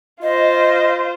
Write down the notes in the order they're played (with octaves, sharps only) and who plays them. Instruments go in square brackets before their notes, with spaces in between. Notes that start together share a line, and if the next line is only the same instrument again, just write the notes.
[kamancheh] F4 C5 [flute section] D#5